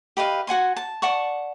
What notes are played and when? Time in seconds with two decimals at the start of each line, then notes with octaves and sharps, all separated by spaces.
0.17 G4 B4 D#5 F5
0.47 F#4 F#5 G#5 C6
0.76 A5
1.02 D5 F#5 A5 C#6